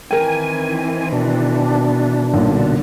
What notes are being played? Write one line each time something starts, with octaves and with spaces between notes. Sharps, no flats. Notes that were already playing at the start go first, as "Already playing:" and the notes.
D#3 E3 C4 A#4 G5 G#5
B2 D4
B1 A#2 D3 G3